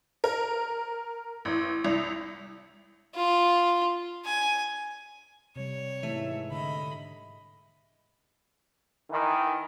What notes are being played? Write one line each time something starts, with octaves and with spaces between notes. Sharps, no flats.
A#4
A1
C2
F4
G#5
C3 G3 C#5
G#2 E3 A3 E5
D3 D#5 B5
D#3 E3